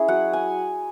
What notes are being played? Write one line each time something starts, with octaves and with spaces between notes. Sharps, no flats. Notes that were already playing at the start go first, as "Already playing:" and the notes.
Already playing: C#4 E4 G#4
F#3 F#5
G#5